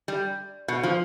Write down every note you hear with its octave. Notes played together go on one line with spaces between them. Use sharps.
G3
B2
F3